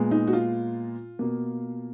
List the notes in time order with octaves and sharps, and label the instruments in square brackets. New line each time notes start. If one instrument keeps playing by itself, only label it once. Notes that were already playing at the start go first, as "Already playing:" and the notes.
Already playing: [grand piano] A#2 G#3 B3
D#4
F#4
F4
B2 A#3